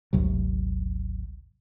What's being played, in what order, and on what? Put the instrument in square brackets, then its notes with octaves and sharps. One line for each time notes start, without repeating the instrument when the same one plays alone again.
[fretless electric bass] G#1 D2 C3 F#3